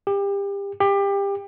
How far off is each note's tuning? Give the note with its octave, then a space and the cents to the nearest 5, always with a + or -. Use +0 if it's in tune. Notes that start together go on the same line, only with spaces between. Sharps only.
G4 +30
G4 +25